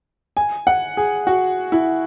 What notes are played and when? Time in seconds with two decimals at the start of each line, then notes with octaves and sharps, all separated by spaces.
0.37 G#5
0.67 F#5
0.97 G#4
1.27 F#4
1.72 E4